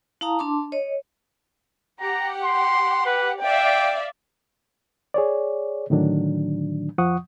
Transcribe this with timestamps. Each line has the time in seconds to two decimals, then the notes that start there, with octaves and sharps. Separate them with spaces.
0.21 E4 F5 A5 A#5 D#6
0.39 D4 A5 C6 D6
0.72 C#5 D#5
2.00 G4 F#5 A#5
2.43 C6
3.06 B4
3.41 D5 E5 F5 G5
5.14 G#4 C#5 D5
5.90 A2 D3 D#3 F#3 D4
6.98 F2 F3 F#5 C#6 D#6